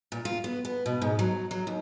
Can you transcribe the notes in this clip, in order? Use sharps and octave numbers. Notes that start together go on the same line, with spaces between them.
A#2
F4
B3
B3
B2
G#2
F#3
F#3
D#2